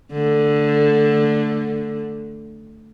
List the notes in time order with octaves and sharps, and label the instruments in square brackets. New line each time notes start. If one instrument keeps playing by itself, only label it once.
[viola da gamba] D3 A3